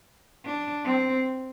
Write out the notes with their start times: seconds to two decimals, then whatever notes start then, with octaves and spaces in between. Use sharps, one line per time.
0.46 D4
0.85 C4